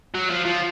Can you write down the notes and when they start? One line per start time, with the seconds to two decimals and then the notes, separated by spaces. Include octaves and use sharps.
0.15 F#3
0.31 F3
0.46 F3